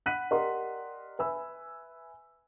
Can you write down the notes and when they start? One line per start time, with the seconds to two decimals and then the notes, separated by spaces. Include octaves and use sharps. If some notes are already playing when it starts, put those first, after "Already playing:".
0.06 F#5 B5 F#6 B6 D#7
0.31 G4 A#4 D5 D#5 F#5 C6
1.19 B4 E5 G#5 B5 E6